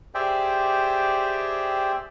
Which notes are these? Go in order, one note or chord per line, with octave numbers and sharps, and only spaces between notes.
G4 G#4 C5 D5 E5 G5